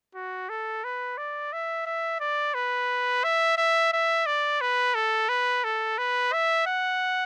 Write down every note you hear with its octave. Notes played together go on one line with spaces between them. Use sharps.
F#4
A4
B4
D5
E5
E5
D5
B4
E5
E5
E5
D5
B4
A4
B4
A4
B4
E5
F#5